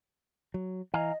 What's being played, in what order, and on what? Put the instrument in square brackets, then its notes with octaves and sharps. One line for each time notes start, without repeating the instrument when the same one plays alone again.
[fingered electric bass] F#3
[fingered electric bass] E3 [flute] D#5 [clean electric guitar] F5 G#5 A#5